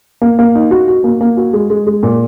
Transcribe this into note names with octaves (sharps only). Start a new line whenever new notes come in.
A#3
A#3
D#4
F#4
F#4
A#3
A#3
F#4
G#3
G#3
G#3
A#2